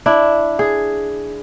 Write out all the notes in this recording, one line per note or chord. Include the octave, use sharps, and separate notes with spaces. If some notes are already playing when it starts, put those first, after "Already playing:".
D4 E4
G#4